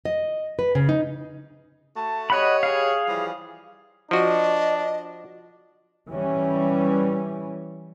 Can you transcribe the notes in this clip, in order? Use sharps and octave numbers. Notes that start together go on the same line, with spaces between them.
D#5
B4
C#3
D#4
A3 F#4 A5
G4 C#5 D#5 F#5 B5
G#4 F5
E3 F3 G3
F3 D4 F#4 D#5
E3 G3 C#4